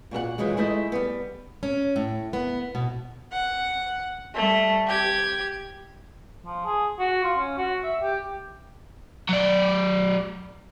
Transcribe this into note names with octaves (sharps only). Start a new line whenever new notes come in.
A#2 F#4 A#4 F#5
A#2 D#3 E3 F#3 G#3
G#3 A3 E4 C5 D#5
G3 B3
C#4
A2
B3
B2
F#5
G3 A3
G4 G#6
F3
G#4
F#4
F4
C#4
F#4
E5
G4
F#3 D5